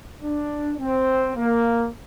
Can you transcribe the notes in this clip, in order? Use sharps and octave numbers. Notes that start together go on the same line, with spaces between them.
D4
C4
A#3